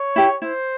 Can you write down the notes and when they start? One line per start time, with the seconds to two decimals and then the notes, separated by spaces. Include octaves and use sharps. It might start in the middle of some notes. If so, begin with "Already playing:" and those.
Already playing: C#5
0.16 E4 G4
0.42 E4 C5